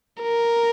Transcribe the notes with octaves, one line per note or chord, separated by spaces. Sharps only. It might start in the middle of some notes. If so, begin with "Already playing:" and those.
A#4